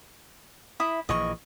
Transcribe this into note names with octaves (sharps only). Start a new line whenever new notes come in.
E4 E5 D#6
A#1 A#2 E3 D#5 C#6